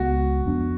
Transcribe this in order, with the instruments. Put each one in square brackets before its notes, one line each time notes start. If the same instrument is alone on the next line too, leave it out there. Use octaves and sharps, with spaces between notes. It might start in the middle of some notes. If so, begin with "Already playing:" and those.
Already playing: [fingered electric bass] C#2 C#3 G#3 B3 [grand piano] F#4
[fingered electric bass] F2 F3 B3 D4